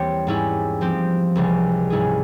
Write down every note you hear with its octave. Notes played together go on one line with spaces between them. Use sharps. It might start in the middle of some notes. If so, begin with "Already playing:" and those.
Already playing: E2 E3 G3 A#3 C4 G4 C#5
G#2 G3 C#4 E4
F3 C4 G4
C#2 C3 E3 G3
G#2 G3 C#4 E4 G#4